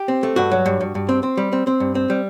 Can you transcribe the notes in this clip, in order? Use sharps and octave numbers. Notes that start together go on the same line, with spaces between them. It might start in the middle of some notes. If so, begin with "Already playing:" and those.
Already playing: G4
C4
A3
G2 F#4
F#3
G2
G2
G2
C4
C4
G3
C4
C4
G2
C4
G3